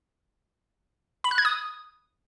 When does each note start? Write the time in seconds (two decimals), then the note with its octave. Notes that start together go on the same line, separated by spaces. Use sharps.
1.24 B5
1.31 F#6
1.38 G#6
1.45 D#6